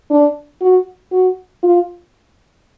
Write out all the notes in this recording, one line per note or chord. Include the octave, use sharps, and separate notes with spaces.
D4
F#4
F#4
F4